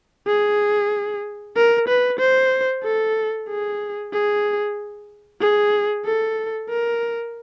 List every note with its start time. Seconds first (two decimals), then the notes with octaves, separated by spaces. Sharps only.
0.27 G#4
1.56 A#4
1.88 B4
2.19 C5
2.83 A4
3.48 G#4
4.13 G#4
5.41 G#4
6.05 A4
6.70 A#4